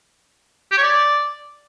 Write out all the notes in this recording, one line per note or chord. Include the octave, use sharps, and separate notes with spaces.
G4
C#5
D5